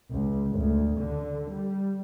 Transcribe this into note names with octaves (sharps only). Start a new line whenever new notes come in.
C#2
D2
D3
G3